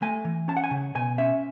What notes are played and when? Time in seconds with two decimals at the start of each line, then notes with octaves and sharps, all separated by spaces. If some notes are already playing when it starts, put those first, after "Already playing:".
0.02 A3 G#5
0.25 E3
0.48 C#4 A5
0.57 F#5
0.64 G#5
0.71 C#3
0.95 B2 G#5
1.18 C#4 E5